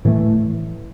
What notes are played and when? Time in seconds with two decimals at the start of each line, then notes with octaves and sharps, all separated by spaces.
0.05 A2 E3 A3